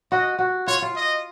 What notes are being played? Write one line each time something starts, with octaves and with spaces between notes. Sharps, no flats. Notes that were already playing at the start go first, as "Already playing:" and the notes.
F#4 D#5
F#4
F4 C#5
F4
D#5